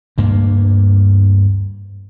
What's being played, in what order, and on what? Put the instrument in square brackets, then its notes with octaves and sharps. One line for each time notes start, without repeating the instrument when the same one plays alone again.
[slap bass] D2 G2 A#3